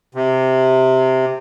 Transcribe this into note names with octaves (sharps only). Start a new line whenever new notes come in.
C3